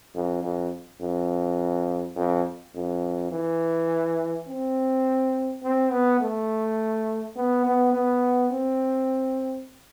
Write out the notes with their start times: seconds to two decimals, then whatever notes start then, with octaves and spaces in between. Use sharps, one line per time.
0.15 F2
0.43 F2
1.01 F2
2.16 F2
2.75 F2
3.32 E3
4.48 C4
5.63 C4
5.91 B3
6.21 A3
7.36 B3
7.65 B3
7.93 B3
8.52 C4